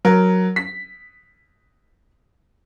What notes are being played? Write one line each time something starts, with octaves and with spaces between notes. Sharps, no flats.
F#3 A#4
B6